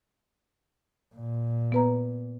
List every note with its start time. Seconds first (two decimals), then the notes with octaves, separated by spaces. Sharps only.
1.15 A#2
1.72 B3 B4 A#5